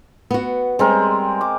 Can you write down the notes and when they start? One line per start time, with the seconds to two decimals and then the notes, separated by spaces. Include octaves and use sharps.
0.31 B3 F#4
0.79 G3 G#3 C4 A#4
1.41 D6